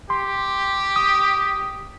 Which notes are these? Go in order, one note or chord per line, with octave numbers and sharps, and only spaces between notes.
G4 C6
D#6